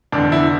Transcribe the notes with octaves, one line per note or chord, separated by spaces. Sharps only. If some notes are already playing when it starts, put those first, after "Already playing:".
F1 E2 D3 D4
E4